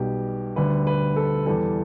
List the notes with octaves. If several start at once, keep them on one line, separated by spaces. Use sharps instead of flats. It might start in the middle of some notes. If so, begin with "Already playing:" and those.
Already playing: B1 B2 G3 G4
D2 D3 G3 B4
B4
A4
E2 E3 G3 A4